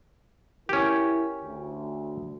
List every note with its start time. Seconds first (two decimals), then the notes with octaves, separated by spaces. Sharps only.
0.69 C#4 E4 G4 A#4
1.41 D2